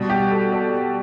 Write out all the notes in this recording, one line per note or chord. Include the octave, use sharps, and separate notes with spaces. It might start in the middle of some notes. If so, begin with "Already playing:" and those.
Already playing: B2 G3
G4
A4
A4 D5